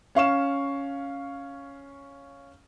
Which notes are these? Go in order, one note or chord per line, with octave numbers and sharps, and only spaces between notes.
C#4 F5 C#6 E7